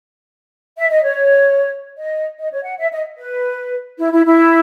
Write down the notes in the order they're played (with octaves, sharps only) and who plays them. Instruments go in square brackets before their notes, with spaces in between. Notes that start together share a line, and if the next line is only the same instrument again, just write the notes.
[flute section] E5
D#5
C#5
D#5
D#5
C#5
F#5
E5
D#5
B4
E4
E4
E4